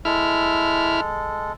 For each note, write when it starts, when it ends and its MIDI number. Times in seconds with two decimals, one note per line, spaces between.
0.05 1.52 56
0.05 1.01 64
0.05 1.52 69
0.05 1.01 89